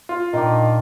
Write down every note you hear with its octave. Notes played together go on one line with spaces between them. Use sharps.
F4
A#2 D#3 D4 D#4